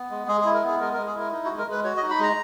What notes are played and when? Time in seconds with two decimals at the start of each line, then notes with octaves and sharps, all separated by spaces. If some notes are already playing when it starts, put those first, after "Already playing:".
Already playing: B3
0.10 G#3
0.28 G#3 G#4
0.41 E4 G#4
0.54 A#4
0.63 B3 G#4
0.80 G#3 A#4
0.93 G#3 A#4
1.06 G#4
1.15 E4 A#4
1.32 D#4
1.45 F#4
1.50 G#3
1.58 A#4
1.67 G#3 B4
1.84 F#4 C#5
1.97 D#5
2.02 D#4
2.10 B5
2.19 G#3 A#5